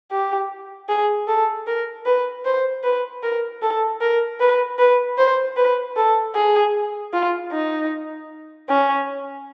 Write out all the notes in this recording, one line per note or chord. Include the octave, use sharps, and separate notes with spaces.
G4
G#4
A4
A#4
B4
C5
B4
A#4
A4
A#4
B4
B4
C5
B4
A4
G#4
F4
D#4
C#4